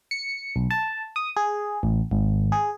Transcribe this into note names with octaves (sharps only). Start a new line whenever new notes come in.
C#7
B1
A5
D#6
G#4
A1
G#1
G#4